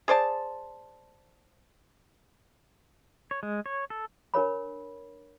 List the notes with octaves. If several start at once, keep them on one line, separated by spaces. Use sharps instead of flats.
G#4 C5 D5 A5
C#5
G#3
C#5
A4
D4 A#4 C#5 B5